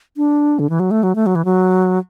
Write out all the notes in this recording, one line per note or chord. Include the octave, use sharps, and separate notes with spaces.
D4
D3
E3
F#3
A3
F#3
A3
F#3
E3
F#3